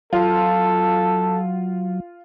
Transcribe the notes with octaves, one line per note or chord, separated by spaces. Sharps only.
F#3 F4 A4